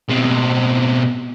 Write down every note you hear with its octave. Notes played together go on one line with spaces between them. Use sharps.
B2 C4